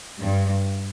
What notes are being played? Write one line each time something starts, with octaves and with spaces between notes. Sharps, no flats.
G2